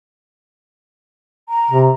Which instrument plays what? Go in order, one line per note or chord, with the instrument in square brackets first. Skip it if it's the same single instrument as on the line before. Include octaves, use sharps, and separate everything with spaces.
[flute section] A#5
[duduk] C3